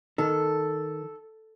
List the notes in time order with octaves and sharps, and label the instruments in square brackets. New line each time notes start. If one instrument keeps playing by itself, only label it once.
[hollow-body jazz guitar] D#3 [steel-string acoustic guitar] A4